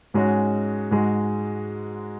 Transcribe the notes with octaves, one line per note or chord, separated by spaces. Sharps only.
G#2 G#3 C#4 F#4
G#2 G#3 F#4